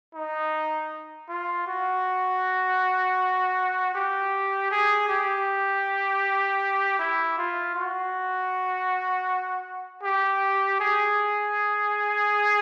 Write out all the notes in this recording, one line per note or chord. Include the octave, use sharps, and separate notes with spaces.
D#4
F4
F#4
G4
G#4
G4
E4
F4
F#4
G4
G#4